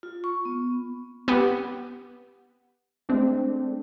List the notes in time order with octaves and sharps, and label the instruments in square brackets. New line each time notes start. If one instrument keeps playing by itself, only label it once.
[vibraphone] F4
C#6
B3
[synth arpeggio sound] B3 G4
G#3 A3 C4 D4